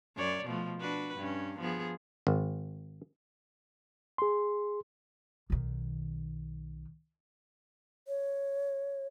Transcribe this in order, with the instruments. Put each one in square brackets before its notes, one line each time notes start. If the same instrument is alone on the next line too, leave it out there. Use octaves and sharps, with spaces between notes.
[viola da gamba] F#2 C#5 D5
B2 F3 A3
D4 F#4 B4
G2 C#4
F3 B3 G#4
[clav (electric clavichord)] G#1
[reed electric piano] G#4 C6
[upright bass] B1 D#3
[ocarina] C#5